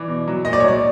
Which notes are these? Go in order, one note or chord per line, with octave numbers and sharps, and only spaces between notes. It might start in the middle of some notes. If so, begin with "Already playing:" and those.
Already playing: E3 D5
B2
F#3
A#2 D#5
D5
C#5
F#3 D5